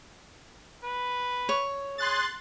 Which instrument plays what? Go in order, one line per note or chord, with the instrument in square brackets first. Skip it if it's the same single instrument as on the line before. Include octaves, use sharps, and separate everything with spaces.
[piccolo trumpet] B4
[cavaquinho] C#5
[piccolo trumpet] G#4 [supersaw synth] C6 F#6 A6